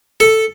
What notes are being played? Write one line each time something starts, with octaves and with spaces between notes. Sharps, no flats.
A4